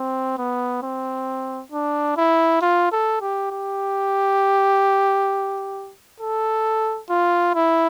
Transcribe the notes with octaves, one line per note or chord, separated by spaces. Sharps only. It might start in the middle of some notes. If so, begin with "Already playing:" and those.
Already playing: C4
B3
C4
D4
E4
F4
A4
G4
G4
A4
F4
E4